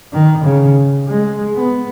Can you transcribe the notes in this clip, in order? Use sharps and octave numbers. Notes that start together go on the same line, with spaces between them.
D#3
C#3
G#3
B3